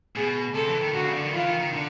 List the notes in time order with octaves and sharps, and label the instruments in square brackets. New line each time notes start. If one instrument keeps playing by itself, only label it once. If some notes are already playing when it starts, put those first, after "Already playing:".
[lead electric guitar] B2 [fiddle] G#4
[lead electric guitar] C3 [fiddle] A4
[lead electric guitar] E3
D#3
[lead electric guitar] D3 [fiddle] F#4
[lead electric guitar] C#3
D3
D#3
[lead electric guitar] E3 [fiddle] F4
[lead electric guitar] D#3
D#3
D3